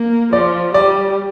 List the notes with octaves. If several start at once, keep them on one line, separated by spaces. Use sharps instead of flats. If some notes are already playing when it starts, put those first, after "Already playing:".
Already playing: A#3
F3 D5
G3 D5